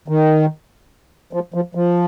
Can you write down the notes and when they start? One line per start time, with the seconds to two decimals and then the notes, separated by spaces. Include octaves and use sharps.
0.08 D#3
1.33 F3
1.54 F3
1.75 F3